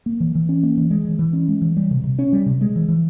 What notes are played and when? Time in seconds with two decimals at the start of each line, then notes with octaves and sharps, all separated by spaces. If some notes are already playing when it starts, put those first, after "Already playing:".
0.06 A#3
0.20 E3
0.35 E3
0.49 C#4
0.63 A#3
0.77 E3
0.91 G#3
1.05 E3
1.19 E3
1.33 C#4
1.48 G#3
1.62 E3
1.77 G3
1.91 C3
2.04 C3
2.19 C#4
2.33 G3
2.46 C3
2.61 G#3
2.76 E3
2.88 E3